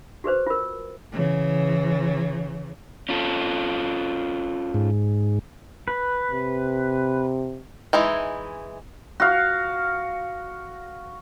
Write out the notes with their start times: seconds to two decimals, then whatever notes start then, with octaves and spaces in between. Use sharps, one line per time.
0.24 F#4 G#4 B4 C5
0.46 F4 A#4
1.12 C#3 E3
3.09 C#4 F4 A4
4.74 G#2
5.88 B4
6.32 C3
7.93 E3 G#3 D#4 E4
9.20 F#4 F5